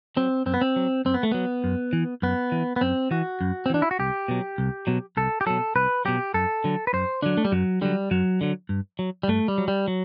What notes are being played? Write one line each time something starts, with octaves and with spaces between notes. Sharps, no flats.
F#3 C4
F#2 C4
B3
C4
F#3
F#2 C4
B3
A3
F#3 B3
F#2
E3
F#2 B3
E3
B3
F#2 C4
E3 F#4
F#2
C4
E3 D4
E4
F#4
C2 G4
B2 F#3
C2
B2 F#3
C2 A4
G4
B2 F#3 A4
C2 B4
B2 F#3 G4
F#2 A4
D3 F#3
B4
F#2 C5
D3 F#3 D4
A3
G3
F#2 F#3
D3 F#3 G3
F#2 F#3
D3 F#3
G2
F#3
G3
G2 A3
G3
F#3
G3
F#3